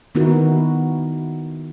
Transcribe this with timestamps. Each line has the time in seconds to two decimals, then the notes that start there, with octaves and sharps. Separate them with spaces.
0.15 D#3 B3 D#4 E4 F#4 A#4